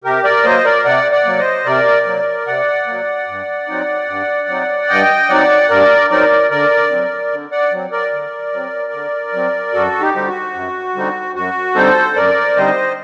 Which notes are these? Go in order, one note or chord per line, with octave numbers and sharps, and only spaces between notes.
C3 G4 A#4
A#4 D5
F#3 A#3 C5 D#5
A#4 D5
C3 D5 F#5
D5 F#5
F#3 A#3
C5 D#5
C3 A#4 D5
F#3 A#3
C3 D5 F#5
F#3 A#3
G2
F#3 C4 D#4
G2
F#3 C4 D#4
G2 D#5 G5
F#3 C4 D#4 D5 F#5
G2 A#4 D5
F#3 C4 D#4 A#4 D5
D3 A#4 D5
F#3 C4
D3
D5 F#5
F#3 C4
A#4 D5
D3
F#3 C4
D3
F#3 C4
F#2 F#4 A4
D#4 G4
D3 G3 C4 D#4
F#4
F#2
D3 G3 C4 D#4
F#2 F#4
D3 G3 C4 D#4 A4 C5
F#2 A#4 D5
D3 G3 C4 D#4 C5 D#5